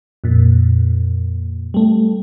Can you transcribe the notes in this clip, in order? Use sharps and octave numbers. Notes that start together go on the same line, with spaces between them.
F2 A#2
G3 A3